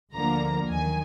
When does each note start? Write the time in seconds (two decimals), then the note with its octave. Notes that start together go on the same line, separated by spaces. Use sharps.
0.14 D2 D3 F3 A#3 A#5
0.69 D#2 D#3 F#3 G#5